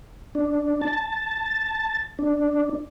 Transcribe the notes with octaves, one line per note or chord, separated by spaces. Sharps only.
D4
A5
D4